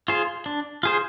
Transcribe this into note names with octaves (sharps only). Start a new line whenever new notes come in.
F4 G#4 C5
D4
F4 G#4 C5